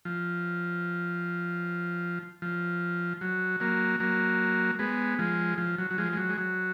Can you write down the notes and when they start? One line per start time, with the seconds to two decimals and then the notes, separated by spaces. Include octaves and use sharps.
0.05 F3
2.42 F3
3.21 F#3
3.60 F#3 A#3
4.00 F#3 A#3
4.79 G#3 B3
5.19 F3 G#3
5.58 F3
5.78 F#3
5.90 F#3
5.98 F3 G#3
6.13 G#3
6.17 F#3
6.30 G#3
6.38 F#3